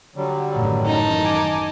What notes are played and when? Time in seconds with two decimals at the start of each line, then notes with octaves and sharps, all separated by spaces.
0.16 D3 F#3 G3
0.56 A1 F#2 D#3
0.86 D#4 A5
1.25 G#5 D6